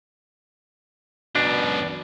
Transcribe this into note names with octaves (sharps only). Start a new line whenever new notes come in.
C#2 F#2 B2 D4